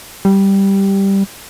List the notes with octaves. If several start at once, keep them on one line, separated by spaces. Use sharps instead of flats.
G3